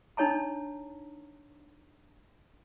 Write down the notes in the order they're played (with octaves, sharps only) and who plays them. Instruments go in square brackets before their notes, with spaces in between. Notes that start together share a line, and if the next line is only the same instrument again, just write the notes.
[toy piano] D4 D#4 C#5 A5 A#5